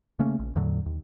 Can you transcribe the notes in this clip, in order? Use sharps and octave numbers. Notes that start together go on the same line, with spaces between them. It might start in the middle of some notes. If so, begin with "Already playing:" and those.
C#3 A3 A#3 C#4
A#1
E2 A2 D3 F#3
D#2